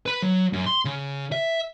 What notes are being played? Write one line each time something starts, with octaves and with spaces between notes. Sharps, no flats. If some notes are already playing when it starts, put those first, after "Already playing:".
B4 B5
F#3
F#2
C6
C#3
E5